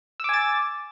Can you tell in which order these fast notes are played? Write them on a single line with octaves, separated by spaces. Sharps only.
E6 D6 G#5 A6